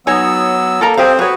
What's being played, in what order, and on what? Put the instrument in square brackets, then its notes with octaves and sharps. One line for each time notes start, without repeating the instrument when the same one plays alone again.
[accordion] F#3 B3 E6 [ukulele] D#4 C#5 G#5
[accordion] A#3 [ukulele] A4 A#4 A#5
[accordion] C4 C5 [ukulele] G4 G#4 F5
[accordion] F#4 B4 [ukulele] G#4 C#5